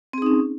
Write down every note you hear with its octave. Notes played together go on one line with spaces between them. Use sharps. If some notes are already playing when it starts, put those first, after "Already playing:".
C4 C#4 D#4 G#4